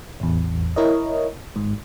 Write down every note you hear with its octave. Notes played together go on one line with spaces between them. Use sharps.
A1 E2
E4 A#4 C#5 D#5
G#1 G#2